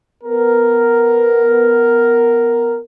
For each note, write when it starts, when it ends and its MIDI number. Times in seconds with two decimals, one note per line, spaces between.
0.24 2.79 59
0.24 2.79 70